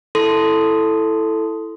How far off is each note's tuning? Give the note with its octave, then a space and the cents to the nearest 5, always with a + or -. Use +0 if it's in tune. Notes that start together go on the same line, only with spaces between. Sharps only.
E4 +0 A4 +0 C6 -15